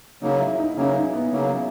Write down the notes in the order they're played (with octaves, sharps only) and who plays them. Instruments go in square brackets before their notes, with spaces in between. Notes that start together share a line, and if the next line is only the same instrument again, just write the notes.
[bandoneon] C#3 F#3 A#3 [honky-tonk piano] D#4
[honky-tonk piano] E4
D#4
[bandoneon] C#3 F#3 A#3 [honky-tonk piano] C#4
[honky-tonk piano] D#4
B3
[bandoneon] C#3 F#3 A#3